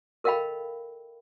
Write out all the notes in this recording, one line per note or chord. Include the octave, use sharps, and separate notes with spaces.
A4 A#4 D#5 F5 G5 B5